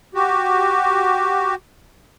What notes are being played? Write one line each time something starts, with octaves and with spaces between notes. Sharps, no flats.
F#4 G4